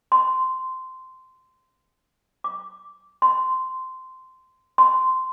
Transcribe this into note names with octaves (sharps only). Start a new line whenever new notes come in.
C6
D6
C6
C6